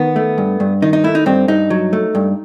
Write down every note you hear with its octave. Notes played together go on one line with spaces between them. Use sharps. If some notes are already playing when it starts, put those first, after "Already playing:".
Already playing: D#3 B3
A3
G2
G2
D#3 D#4
D#4
A3 E4
D#4
G2 C4
G2 D#4
F#3
A3
G2